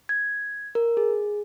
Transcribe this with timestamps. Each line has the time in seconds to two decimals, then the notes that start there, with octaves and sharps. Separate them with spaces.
0.09 G#6
0.75 A#4
0.97 G#4